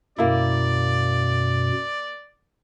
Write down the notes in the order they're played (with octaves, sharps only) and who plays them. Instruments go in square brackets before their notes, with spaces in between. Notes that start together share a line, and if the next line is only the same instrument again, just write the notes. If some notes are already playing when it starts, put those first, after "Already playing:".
[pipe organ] F#2 B2 [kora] A#3 E4 [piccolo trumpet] D5